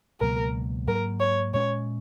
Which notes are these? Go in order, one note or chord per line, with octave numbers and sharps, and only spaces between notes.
C#2 B2 F#3 A#3 A#4
G#2 F#3 A#3 A#4
C#5
A#2 G#3 C#4 C#5